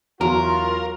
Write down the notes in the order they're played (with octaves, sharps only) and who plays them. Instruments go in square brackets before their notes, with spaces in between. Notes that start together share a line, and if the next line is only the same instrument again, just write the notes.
[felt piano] E2 [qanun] F#3 [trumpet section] F4 [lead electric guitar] A#4